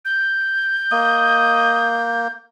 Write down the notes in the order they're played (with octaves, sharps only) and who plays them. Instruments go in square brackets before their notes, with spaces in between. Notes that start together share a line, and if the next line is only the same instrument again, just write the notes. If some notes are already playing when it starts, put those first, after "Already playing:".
[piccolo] G6
[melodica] A#3 [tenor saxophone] D#5